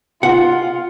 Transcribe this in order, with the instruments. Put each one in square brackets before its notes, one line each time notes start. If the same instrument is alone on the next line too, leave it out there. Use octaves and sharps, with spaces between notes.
[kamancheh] F4 [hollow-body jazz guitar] F#5